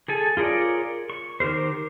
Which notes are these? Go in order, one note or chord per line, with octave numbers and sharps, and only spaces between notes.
G#4 A4 G#5
F4 G#4 A#4 C#5 D5
C#6
D#3 G4 A#4 C5